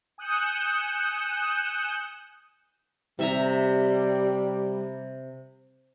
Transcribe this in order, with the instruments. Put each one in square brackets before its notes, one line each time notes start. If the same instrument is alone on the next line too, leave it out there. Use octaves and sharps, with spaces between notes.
[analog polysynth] G#5 D#6 F#6 G6 C#7 E7
[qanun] C3 E5 A#5 [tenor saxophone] G3